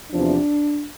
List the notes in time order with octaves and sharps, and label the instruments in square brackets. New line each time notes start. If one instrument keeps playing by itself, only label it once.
[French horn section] E2 C3 F3 D4